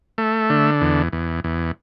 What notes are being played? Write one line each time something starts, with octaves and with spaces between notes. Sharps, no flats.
A3
D3
E2
E2
E2